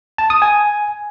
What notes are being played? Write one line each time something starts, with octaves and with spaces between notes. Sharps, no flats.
A5
D#6
G#5